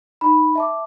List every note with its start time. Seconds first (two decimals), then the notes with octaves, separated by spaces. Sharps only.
0.21 D#4 B5
0.55 E5 A5 D6